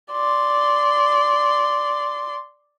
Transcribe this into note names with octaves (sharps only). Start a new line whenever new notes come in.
D5 C6